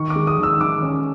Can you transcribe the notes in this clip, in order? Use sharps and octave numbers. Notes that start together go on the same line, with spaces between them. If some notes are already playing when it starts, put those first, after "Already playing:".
Already playing: D#3 C#6
D6
G#3
D#6
D#3
E6
D#3 D6
C#4